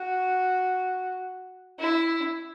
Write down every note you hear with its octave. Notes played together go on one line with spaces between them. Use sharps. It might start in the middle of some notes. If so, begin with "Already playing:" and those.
Already playing: F#4
E4